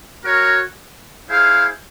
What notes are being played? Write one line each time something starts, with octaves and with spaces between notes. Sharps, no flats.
F#4 A#4 C#5
E4 G#4 C5 F5